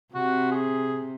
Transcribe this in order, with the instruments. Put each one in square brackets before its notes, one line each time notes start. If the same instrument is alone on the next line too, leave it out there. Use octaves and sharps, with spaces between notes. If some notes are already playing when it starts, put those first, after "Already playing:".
[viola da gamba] C3 [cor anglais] F#4
[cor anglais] G#4